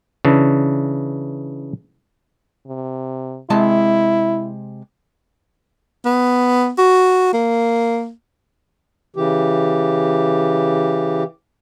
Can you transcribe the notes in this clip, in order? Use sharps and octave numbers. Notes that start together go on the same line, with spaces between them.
C#3 E3 D4
C3
C3 G#3 E4 A5
B3
F#4
A#3
C#3 E3 G4